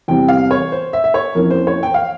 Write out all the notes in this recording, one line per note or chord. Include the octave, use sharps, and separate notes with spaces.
E2 C3 E3 G3 C4 G5
F5
C#5
C5
E5
E5
C#5
F2 E3 A#3 C#4 A#4
C5
C#5
G5
F5